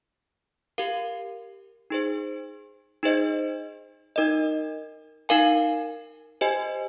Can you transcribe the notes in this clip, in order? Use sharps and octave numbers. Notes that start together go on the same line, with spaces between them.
G4 A#4 F5
D#4 G#4 C5
D#4 G#4 C5 D#5
D#4 A#4 D#5
D#4 A#4 F5 G#5
G4 C5 D#5 G#5